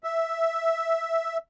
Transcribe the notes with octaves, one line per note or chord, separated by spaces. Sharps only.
E5